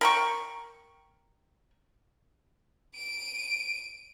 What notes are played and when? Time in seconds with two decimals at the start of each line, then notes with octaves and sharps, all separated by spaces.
0.01 A#4 G5 C#6
2.95 D7 D#7